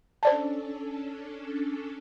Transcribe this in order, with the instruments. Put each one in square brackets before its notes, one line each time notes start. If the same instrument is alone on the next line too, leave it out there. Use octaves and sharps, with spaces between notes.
[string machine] C#4 D4 A4 [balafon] C5 D5 A5